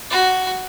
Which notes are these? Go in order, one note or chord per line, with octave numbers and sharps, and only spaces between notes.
F#4